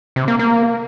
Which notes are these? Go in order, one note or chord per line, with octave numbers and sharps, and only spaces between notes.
C3
A#3
A#3